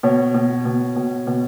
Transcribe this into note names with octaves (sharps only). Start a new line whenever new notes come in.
B2 C#5
B2
B2
B2
B2